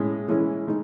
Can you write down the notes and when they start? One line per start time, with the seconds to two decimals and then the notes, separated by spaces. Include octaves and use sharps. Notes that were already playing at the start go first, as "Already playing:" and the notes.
Already playing: A2 G#3 C#4 G#4
0.28 E3 G#3 C#4 E4
0.67 D#3 G#3 D#4